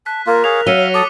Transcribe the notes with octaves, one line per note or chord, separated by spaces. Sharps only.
A5 F#6 B6
A#3 F4 A#4
G#4 C#5 F5 F7
F#3 E5 F5 C#7 D#7 G7
A4 D6 D#6 D#7